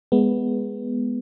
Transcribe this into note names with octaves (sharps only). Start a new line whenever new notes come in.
G#3 B3